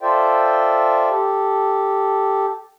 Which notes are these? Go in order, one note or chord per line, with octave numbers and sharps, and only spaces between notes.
F4 A4 C5 D5 E5 G5
G4 A4